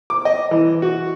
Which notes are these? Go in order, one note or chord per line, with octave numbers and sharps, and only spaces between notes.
D6
D#5
E3
F#4